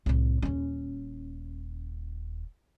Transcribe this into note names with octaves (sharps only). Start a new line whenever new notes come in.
C2 A2
D#1 C#4